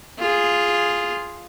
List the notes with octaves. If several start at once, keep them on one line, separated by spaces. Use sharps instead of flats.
F4 G#4